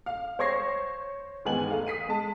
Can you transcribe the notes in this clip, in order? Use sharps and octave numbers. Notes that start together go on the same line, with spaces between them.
F5
C5 C#5 C#6 G#6 A#6 C7
E2 G#2 D#3 B3 G#5 F#7
A3 F5
D#6 B6 C7 D#7
G#3 A5